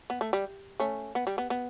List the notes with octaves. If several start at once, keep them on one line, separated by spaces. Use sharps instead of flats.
B3
A3
G3
A3 C#4
B3
G3
B3
B3